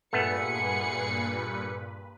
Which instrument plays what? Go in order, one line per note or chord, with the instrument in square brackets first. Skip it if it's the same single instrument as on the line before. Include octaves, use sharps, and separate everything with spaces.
[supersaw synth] G2 A#2 B4 [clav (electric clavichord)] A3 B3 [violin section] G#4 C#7